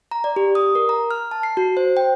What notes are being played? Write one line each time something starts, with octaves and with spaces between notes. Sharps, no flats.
A#5
D5
G4
D#6
A#4
A#5
F6
A5
C7
F#4
C5
G5